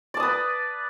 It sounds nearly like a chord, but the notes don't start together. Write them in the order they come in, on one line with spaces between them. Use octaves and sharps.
D5 A5 D#6 B4